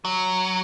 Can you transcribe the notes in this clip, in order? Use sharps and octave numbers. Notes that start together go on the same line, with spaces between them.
F#3